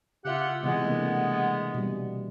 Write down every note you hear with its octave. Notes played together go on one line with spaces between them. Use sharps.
C#3 F4 G4 E5 F#5
C3 E3 G#3 B3
A3 A#3 D4
B2 G3